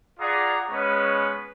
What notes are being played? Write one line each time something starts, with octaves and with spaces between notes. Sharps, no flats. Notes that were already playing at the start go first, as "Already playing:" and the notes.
F4 G#4 D5 F#5 A#5
G#3 B3 C#4 B4 C#5